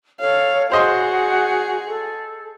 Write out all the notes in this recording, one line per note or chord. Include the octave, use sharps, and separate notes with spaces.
A4 C#5 F5
F#4 G#4 C5 D#5 F#5 C6
A4